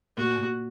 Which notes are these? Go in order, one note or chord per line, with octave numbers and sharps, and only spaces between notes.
A#2 F#4
A#2